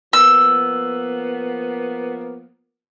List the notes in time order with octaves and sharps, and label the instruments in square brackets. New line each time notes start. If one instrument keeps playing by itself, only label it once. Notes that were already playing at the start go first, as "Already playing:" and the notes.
[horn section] F3 A#3 B3 [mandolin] E6